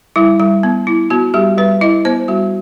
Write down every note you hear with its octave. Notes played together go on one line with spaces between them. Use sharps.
G3 E4
G3
B3
E4
B3 F#4
G3 G4
G3 B4
E4 D#5
B3 C5
G3 F#4